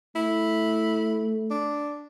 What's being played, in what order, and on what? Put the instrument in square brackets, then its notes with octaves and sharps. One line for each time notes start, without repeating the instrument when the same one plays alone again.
[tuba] A3 [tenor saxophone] E4
[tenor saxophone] D4